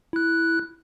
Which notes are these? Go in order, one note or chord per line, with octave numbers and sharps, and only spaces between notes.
E4 F#6